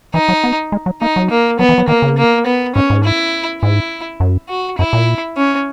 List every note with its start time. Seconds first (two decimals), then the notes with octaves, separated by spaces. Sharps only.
0.14 E3 D#4
0.29 F#3
0.44 B3
0.72 G#3
0.86 F#3
1.01 A#3 D#4
1.16 F#3
1.30 A#3
1.59 F#3 B3
1.69 E3
1.78 F#3
1.88 D#3 A#3
2.02 C#3
2.18 A#3
2.46 B3
2.75 G#2 C#4
2.90 G#2
3.04 E4
3.62 G#2 E4
4.20 F#2
4.49 F#4
4.78 F#2 E4
4.93 A#2
5.37 C#4